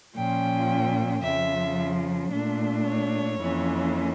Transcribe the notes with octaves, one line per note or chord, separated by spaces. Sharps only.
A#2 F3 C#4 G5
F2 C#3 F3 E5
A#2 A3 D4
C#5
F2 E3 A#3 C#4